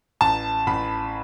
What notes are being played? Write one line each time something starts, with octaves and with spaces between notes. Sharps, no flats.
A1 A5
A1 B5